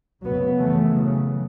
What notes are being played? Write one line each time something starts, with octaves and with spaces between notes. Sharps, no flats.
F#2 C#3 F#3 B3
E3 A3
C#3 F#3